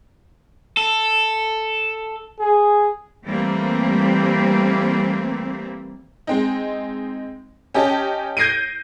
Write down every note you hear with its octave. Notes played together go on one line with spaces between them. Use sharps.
A4
G#4
E3 G3 A3 A#3 C4
G#3 C4 D#4
C#4 G4 D#5 A5
G6 G#6 A#6 C7 D7 D#7